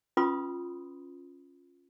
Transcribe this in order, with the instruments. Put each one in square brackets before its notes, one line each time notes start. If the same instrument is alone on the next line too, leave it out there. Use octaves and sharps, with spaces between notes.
[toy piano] C#4 F4 B4 B5 C6 D#6